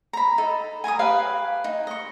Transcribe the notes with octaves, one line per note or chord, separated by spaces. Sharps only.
A#5 B5
D#4 A4
G#5 A#5 C6 D#6
G4 B4 C#5 F5
D#4
D#5 C#6